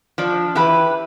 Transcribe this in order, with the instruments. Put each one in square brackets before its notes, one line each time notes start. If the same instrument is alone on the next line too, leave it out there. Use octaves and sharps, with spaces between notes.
[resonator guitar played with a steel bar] F3 [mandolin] D4
[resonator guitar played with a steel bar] E3 [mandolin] G4 B4